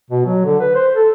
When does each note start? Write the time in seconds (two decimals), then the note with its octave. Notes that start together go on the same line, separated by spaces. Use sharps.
0.10 B2
0.26 F#3
0.44 D3
0.61 B4
0.75 C5
0.95 A4